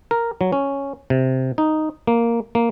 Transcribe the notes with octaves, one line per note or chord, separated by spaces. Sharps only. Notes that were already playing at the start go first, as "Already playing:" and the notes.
A#4
F#3
C#4
C3
D#4
A#3
A#3